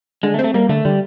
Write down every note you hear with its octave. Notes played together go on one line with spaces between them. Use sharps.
D3 G#3
A3
C4
A3
G3 A#3
D3 A3
D3 G3